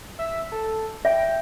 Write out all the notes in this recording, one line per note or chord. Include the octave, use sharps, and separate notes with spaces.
E5
A4
E5 G5